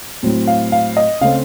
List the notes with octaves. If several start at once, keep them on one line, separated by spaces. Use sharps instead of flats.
A2 F#3 C4
F5
F5
D#5
C#3 A3 C4 F5